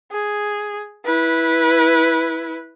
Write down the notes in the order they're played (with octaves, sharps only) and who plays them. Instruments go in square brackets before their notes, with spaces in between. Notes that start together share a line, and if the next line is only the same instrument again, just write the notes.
[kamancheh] G#4
E4 B4